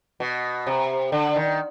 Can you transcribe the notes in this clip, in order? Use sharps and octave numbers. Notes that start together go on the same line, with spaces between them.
B2
C3
D3
D#3